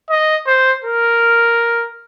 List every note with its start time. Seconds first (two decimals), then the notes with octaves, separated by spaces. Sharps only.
0.10 D#5
0.47 C5
0.84 A#4